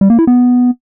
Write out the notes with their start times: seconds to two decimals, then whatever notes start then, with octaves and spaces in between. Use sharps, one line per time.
0.01 G3
0.10 A#3
0.19 E4
0.27 B3